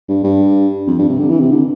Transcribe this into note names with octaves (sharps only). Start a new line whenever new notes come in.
G2
G2
F2
G2
C3
D3
E3
C3
D3